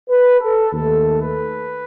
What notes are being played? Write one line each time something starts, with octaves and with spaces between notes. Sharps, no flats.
B4
A4
D#2 D#3 A3 A4
B4